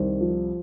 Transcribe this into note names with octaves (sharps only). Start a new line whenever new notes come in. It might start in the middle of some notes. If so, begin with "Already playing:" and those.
Already playing: C2 D#3 C5
F3